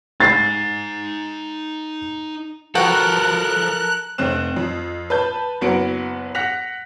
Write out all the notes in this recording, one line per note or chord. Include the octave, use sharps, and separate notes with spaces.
D#4 G#5 A6 C7
F3 B3 F#4 A4 A#4 G5 F#6
F1 C4 F#6 E7
F2
B4 A5 G6
F#1 F#3 B3 F#5 D7
F#5 F#6 A#6 B6 F7